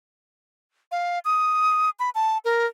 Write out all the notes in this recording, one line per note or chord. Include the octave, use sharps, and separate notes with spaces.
F5
D#6
B5
A5
A#4